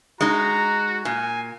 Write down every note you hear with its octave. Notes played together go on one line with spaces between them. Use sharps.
G#3 D#4 F#4 A#5
A#2 G#5